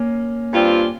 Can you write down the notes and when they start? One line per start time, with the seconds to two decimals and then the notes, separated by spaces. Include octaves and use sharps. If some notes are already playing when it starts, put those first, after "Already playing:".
Already playing: A#3 C#4
0.53 G2 G3 C4 F4